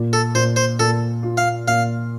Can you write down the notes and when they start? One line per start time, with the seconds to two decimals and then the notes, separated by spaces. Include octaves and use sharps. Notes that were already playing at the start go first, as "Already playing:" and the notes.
Already playing: A#2
0.13 A4
0.35 A#2 C5
0.56 C5
0.79 A#2 A4
1.23 F4
1.37 F5
1.67 A#2 F5